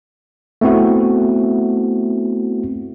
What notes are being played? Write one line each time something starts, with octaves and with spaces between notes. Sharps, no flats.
A3 B3 C4 E4 F#4